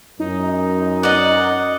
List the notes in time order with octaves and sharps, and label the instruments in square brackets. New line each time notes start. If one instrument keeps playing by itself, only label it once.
[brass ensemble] F#2 [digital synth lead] D#4
[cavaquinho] D5 D#5 [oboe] F#5